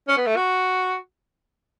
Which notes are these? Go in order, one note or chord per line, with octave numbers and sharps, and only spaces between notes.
C#4
B3
A3
F#4